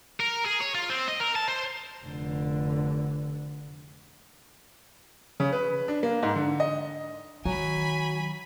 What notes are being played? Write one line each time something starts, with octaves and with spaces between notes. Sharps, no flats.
A#4
G#4
C#5
F4
C4
D#5
A#4
A5
C5
F1 D3
C#3
B4
D4
A#3
G#2
D3
D#5
D#3 F#3 G#5 B5